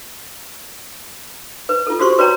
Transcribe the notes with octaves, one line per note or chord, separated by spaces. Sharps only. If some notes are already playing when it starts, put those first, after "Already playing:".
B4
F4 A4
F#4 G4 C5 C6 C#6
F#4 B4 C#5 D5 G5 A#5